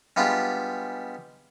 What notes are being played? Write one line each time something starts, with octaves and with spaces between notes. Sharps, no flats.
G3 G#3 B3 D4 F4 G4